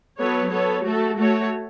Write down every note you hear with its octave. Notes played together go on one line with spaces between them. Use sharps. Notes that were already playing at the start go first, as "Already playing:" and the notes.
F#3 B3 A4 C#5
B3 A4 C#5
A3 F#4 A4
A3 F#4 A4 C#5